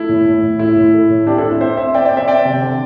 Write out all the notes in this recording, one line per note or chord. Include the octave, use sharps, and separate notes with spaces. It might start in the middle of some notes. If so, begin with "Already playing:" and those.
Already playing: A3 E4
A2
A2
A2
A3 E4
A2
A3
A2
C4 D4 G4
E4 A4
C4
C4 C5 E5
C4 C5 E5
C4 D5 G5
D5 G5
C4
C5 E5
C4 D5 G5
C3
D3